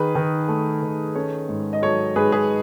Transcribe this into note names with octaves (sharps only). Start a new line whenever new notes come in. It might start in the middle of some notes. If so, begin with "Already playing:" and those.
Already playing: D#3 G#4 B4
D#3
A3
D#3
C#4 A4 C#5
G#2
D#5
F#3 A4 C#5
G#2 G#4 B4
G#4 B4